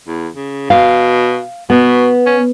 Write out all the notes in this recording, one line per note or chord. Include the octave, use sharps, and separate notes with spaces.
E2
C#3
B2 F5
B2 B3
C#4